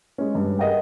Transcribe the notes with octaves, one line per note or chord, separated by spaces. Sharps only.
G#3 C#4
G2
G#4 A#4 D#5 F#5 G5